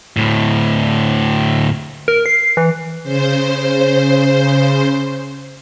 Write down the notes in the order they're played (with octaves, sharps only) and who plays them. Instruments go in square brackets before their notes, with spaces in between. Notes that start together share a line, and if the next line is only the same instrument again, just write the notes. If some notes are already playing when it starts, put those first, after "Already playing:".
[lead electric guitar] D2 A2
[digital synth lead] A#4
C7
E3
[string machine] C#3 C5